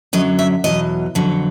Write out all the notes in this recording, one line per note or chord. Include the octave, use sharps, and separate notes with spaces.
F#2 D3 F#3 D#5
E5
E2 B2 F#3 D#5
F2 D3 F#3